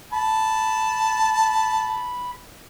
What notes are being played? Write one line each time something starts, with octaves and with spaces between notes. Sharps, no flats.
A5 B5